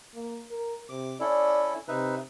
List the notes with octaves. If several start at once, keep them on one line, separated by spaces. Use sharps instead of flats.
A#3
A#4
C3 D6
C#4 E4 A4 D5
C3 D#4 B4 E5